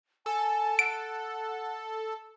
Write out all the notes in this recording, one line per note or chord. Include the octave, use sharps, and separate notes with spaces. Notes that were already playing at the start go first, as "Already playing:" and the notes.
A4 G#5
F#5 D7